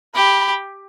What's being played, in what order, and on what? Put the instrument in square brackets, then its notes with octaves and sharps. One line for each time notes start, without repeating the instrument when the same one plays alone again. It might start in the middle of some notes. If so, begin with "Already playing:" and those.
[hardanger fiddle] G4 [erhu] B5